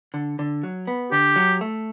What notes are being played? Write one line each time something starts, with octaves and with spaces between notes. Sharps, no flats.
D3
D3
F#3
B3
D3 G4
F#3
A3